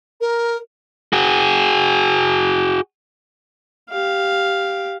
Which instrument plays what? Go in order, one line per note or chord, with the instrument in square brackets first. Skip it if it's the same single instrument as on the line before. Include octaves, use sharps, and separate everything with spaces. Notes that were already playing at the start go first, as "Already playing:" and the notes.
[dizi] A#4
[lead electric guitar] F#4 G#4
[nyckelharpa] G4 F5